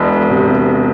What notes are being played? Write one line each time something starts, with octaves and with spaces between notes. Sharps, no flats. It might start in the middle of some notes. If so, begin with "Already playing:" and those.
Already playing: E1 E2
C3